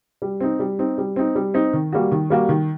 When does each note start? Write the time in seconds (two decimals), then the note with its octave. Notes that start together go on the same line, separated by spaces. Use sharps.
0.22 G3
0.40 C4 D#4
0.60 G3
0.79 C4 D#4
0.98 G3
1.16 C4 D#4
1.35 G3
1.54 C4 D#4
1.73 D#3
1.93 G3 A#3 F#4
2.11 D#3
2.30 G3 A#3 F#4
2.49 D#3